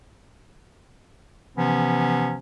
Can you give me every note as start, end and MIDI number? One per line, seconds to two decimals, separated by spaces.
1.56 2.38 48
1.56 2.38 52
1.56 2.38 53
1.56 2.38 59
1.56 2.38 61